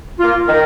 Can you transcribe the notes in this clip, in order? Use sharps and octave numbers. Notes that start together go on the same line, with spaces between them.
A#3 F4
D#3 A#4